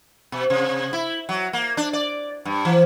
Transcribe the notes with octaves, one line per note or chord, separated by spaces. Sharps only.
B2
C3
E4
F#3
A#3
D4
D5
G2
E3